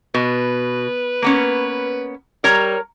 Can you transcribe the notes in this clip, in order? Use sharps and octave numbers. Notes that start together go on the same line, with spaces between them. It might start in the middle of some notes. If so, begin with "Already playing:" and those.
B2 B4
A#3 B3 C#4
G3 A#4 C#5 A#5